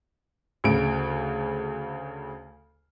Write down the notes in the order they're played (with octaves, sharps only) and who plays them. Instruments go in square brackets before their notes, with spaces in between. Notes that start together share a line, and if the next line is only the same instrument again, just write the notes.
[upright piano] D2 C#3 D7